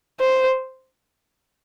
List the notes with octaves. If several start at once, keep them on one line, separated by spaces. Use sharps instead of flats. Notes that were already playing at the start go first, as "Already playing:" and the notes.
C5